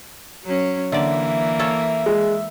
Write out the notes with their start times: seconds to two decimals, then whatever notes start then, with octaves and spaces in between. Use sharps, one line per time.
0.44 F#3 C#4
0.92 D3 E3 A#3 D5 E5
1.59 A4 C#5 F5
2.06 G#3